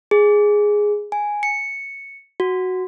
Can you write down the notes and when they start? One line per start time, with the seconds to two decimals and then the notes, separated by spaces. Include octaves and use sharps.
0.11 G#4
1.12 G#5
1.43 C#7
2.40 F#4